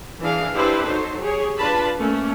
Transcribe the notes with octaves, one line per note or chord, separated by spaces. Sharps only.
E3 D4 G#4 F5
D4 E4 G4 B4 C5
F#3 D#4 A4 C5
G4 G#4 C#5
D4 F4 B4 A5 B5
A3 A#3 C#4